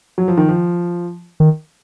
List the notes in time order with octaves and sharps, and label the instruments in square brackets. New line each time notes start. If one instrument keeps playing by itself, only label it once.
[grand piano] F#3
F3
D#3
F3
[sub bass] D#3